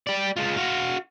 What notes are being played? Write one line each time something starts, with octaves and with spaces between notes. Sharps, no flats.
G4 D5
G#3 F4
F#4 F5